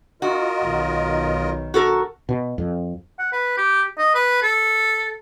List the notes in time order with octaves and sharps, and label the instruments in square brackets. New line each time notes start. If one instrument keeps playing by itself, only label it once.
[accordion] F4 A#4 D#5 [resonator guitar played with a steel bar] F#4
[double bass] B1 D#3
[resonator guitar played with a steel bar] F#4 A4 A#4
[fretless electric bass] B2
F2
[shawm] F#5
B4
G4
D#5
B4
A4